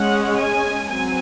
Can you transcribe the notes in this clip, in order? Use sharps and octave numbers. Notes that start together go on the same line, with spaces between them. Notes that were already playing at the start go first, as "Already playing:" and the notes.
Already playing: G#3 C#4 F#5
G#5
F#3 C4 G#5